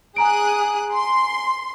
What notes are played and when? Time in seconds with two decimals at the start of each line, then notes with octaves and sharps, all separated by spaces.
0.16 G#4 G#5 A#5 D#6 F#6 D7
0.93 C6